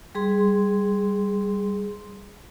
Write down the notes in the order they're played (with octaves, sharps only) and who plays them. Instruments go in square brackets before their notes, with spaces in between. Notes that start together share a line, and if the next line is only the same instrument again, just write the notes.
[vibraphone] G3 G#4 C6